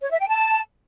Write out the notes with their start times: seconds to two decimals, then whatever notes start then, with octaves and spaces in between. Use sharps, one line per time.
0.01 C#5
0.11 E5
0.20 G5
0.29 A5